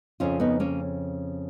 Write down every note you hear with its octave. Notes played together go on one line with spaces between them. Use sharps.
F2 C#3 C#4 F4
B3 D#4
A#3 C#4